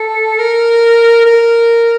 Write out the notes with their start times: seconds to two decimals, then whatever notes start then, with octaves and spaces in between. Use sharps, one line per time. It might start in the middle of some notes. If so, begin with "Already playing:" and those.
Already playing: A4
0.38 A#4
1.26 A#4